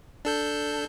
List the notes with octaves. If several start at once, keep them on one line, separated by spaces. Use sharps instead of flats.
D4 A4 G6